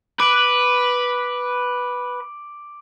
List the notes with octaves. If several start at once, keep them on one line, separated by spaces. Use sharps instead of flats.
B4 D6 D7 F#7